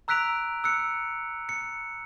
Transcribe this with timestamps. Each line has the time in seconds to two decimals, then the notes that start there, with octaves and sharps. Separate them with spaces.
0.08 A#5 E6 F#6 B6 D7 F7
0.64 E6 F#6 C#7
1.49 C#7